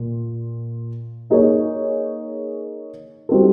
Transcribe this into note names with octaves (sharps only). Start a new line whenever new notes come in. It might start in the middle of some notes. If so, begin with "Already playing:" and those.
Already playing: A#2
A#3 D#4 G#4 C#5
G3 C4 D#4 F#4 A4